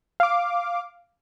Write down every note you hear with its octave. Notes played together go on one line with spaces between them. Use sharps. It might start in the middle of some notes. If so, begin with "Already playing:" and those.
F5 D6